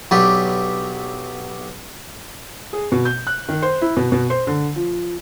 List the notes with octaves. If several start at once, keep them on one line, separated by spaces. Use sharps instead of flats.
B1 F#3 D4 G4 B4
G#4
B2
G6
F#6
D#3
C5
E4
B2
B2
C5
D3
F3